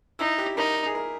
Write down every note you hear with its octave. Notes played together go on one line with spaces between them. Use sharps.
D#4 E4
G4
D#4 A#4
G#4
A#4